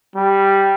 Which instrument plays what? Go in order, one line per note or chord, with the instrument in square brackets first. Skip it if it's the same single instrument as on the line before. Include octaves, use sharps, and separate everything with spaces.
[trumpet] G3